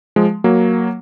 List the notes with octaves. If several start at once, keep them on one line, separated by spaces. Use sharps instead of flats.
F3 G#3
F#3 A#3